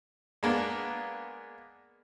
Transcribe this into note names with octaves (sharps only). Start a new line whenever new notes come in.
G#3 A#3 B3 D4